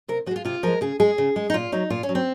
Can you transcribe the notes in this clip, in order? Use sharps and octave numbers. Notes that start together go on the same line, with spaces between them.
C3 A#4
F3 F#4
G#3 F4
C3 F4
F3 G#3 A#4
C#3 G#4
G#3 G#4
C#3
G#3
D#4
A#2 F4
F#3 D#4
A#2 F4
C#4
F#3
C4